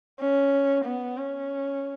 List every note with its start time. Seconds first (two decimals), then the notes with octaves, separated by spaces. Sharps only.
0.20 C#4
0.85 B3
1.17 C#4